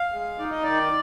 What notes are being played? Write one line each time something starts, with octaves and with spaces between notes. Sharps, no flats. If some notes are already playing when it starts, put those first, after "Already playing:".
Already playing: F5
G#3
D#4 D5
D#5
D#3 D5